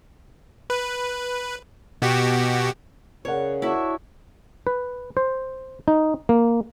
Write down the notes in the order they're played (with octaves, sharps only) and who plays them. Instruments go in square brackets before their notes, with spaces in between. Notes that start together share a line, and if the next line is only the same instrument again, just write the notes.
[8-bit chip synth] B4
B2 F#4 G4
[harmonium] C#3 [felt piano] A#4 F#5 [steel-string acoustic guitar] C#5
[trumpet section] D4 C#5 [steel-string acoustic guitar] E4 F#4 E5
[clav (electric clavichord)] B4
C5
D#4
A#3